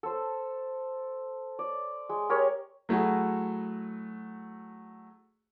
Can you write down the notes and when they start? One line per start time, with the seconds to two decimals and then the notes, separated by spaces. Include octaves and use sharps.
0.03 A4 C5
1.59 D5
2.09 G#3
2.29 G4 A#4 C#5 D#5
2.89 F#3 A3 E4 F#4 G#4